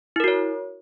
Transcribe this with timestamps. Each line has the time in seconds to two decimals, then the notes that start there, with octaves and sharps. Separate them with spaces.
0.16 E4
0.20 A#4
0.24 F#4
0.28 C#5